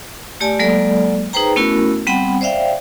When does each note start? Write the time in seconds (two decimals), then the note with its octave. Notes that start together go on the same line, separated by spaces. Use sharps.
0.40 A3 G4 D5 G#5 A5
0.59 F#3 G#3 A#3 A4 D5
1.33 D#4 G#4 B4 C5 G5 A#5
1.56 A3 B3 C#4 E4 F#4 A#4
2.07 G3 B3 C4 F#5 G5 B5
2.41 C5 D5 E5 F5 G5